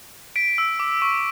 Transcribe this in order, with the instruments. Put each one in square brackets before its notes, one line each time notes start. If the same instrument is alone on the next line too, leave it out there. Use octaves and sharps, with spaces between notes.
[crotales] B6 D7
E6
D6
C#6